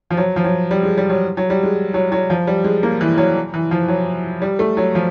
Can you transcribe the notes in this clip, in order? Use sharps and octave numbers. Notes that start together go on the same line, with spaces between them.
F3
F#3
F3
F#3
G3
G#3
G3
F#3
F#3
G3
G#3
F#3
F#3
F3
G3
G#3
A#3
E3
F#3
E3
F3
F#3
G3
A3
F#3
F3